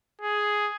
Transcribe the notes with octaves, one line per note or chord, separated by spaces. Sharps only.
G#4